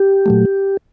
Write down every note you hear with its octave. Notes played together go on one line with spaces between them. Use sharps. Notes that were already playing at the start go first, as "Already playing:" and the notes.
Already playing: G4
A#2 F#3 A3